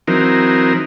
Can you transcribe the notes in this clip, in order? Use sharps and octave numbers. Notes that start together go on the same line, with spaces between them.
E3 F#3 C4 D#4 A#4